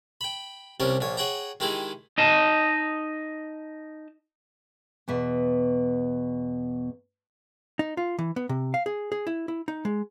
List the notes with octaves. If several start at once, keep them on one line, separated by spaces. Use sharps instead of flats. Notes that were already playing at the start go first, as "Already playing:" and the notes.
G5 B5
C2 C3 G3 C#4 A#4
A#1 A#2 C#5
G#4 C#5 F#5 G5 A#5
D#3 G#3 D#4 E4 G4 G#4
D#4 D#5 A5
E2 B2 E5
D#4
F4
E3
B3
C3
F5
G#4
G#4
E4
E4
D#4
G#3